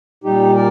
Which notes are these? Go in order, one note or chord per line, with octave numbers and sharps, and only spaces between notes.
A#2 G3 D#4 G4
A#4 D5